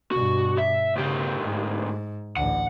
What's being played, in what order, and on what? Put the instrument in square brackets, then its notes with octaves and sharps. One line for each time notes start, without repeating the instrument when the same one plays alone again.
[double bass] G2 B2 [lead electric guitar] F#4
[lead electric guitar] E5
[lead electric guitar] D2 G4 [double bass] C#3
[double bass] G#2
[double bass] A1 D2 [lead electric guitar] F#5